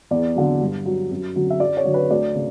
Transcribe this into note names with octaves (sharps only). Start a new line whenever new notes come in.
E2 D5
D3 F#3
G2
F#3
F#2
D3 F#3
E5
F#2 D5
C#5
D3 F#3
B4
D2 D5
C#3